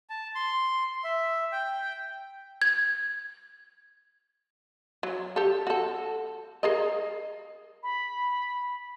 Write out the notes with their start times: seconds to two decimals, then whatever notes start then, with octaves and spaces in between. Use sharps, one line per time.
0.10 A5
0.35 C6
1.04 E5
1.52 G5
2.62 G#6
5.03 F#3
5.36 G4 A4
5.67 F#4 A4
6.63 G#4 A#4 D#5
7.83 B5